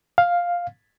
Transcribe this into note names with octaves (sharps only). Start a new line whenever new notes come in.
F5